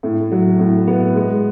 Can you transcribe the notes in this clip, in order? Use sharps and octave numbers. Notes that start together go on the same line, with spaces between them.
A2
F#3
A2
B3
G#3